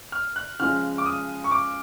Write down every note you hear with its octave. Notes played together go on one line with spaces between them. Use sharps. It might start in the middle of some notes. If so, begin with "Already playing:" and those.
F6
F#6
C#3 F3 G#3 F6
D6
D#6
C#6
D6